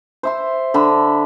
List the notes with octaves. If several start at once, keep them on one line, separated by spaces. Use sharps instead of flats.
C5 E5 C6
D3 B5